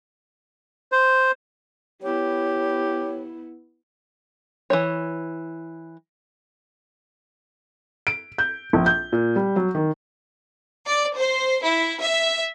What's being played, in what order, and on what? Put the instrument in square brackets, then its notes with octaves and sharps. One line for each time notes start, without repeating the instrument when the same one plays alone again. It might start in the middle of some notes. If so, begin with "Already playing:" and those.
[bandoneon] C5
[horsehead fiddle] B3 E4 [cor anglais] G4 [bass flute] C#5
[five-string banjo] E3 A#3 C#5
[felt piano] D7
G6
A#1
G6
A#2
G3
F#3
D#3
[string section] D5
C5
E4
E5